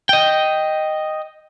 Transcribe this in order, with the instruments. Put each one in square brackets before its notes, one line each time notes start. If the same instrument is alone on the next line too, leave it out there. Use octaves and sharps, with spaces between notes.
[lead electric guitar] D#5 G5